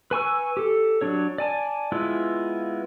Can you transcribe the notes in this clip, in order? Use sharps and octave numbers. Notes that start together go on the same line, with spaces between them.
B4 G#5 C#6 E6
G4 A4
F#3 D4 C#5
D5 G#5 A5
G#3 B3 E4 F4